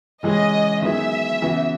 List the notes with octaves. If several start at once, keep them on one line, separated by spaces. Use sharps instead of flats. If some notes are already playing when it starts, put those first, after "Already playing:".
C#3 E3 G#3 C#4 G#4 D#5
D#3 F#3 B3 E4 G#4 E5
C#3 E3 B3 F#4